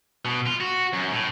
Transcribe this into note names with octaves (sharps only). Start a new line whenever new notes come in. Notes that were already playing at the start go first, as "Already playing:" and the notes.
B2
F4
F#4
F#2
A2